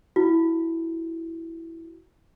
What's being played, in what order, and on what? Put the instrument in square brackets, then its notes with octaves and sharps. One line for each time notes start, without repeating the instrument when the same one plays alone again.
[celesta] E4 F#4